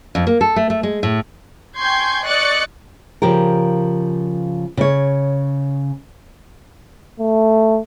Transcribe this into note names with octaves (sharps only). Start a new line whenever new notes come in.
F2
A#3
A4
A3
A3
G#3
A2
G5 G#5 C6 C#6 G6 G#6
D5 D#5 C#6 F#6 A6 C#7
C#3 F3 G4 A#4
C#3 C#5
A3